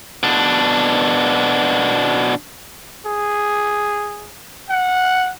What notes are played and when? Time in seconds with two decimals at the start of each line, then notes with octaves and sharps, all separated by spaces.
0.23 B2 D4
3.05 G#4
4.69 F#5